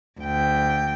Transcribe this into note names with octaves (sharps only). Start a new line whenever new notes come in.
D2 G5